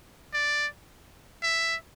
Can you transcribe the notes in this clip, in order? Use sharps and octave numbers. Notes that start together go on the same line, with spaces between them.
D5
E5